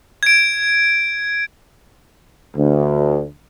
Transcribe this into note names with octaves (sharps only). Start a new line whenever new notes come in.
G#6 D7
D2